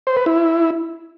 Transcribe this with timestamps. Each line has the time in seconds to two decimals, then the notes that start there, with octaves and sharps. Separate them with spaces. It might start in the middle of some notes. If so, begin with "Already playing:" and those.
0.07 C5
0.17 B4
0.26 E4